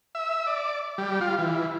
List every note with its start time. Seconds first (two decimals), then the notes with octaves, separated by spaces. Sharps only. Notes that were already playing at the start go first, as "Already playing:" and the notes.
0.15 E5
0.47 D5
0.98 G3
1.21 F4
1.39 E3